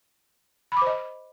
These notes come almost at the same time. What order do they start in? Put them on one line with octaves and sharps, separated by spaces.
B5 D6 C5 D#5